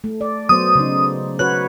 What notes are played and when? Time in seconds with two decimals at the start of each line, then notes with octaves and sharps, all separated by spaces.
0.04 A3
0.21 D5
0.49 F#3 B3 C5 D#6
0.75 C#3 D#4
1.39 F#4 B4 C#5 F#6